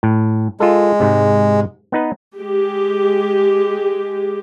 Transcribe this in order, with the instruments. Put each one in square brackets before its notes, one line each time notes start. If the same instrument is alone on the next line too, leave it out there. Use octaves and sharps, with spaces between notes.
[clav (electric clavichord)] A2
[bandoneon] G#3 [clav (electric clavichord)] F4 A4
[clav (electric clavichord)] G#2 C3
B3 D#4 B4
[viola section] G#3 G4